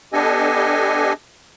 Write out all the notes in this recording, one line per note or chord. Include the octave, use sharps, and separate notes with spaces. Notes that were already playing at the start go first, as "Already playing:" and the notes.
B3 D4 G4 A4 D#5 G#5